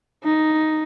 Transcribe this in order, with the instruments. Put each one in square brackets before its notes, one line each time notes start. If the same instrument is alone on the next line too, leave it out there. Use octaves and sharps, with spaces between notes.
[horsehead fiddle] D#4